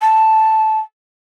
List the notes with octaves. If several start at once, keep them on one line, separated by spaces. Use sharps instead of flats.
A5